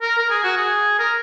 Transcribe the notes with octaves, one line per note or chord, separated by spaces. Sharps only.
A#4
A#4
G#4
F#4
G#4
A#4